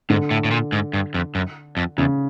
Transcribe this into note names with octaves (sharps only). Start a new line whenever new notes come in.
G#2 D3
A2
A2
A#2
G#2
G2
F2
F#2
F2
E2 C#3